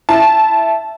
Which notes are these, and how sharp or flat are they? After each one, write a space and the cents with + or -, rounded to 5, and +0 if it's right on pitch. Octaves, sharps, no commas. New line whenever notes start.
E4 +5 A5 -10